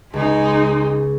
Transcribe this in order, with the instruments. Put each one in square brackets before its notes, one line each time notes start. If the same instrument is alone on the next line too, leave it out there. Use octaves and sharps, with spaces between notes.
[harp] C#2 [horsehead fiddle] G#3 D#4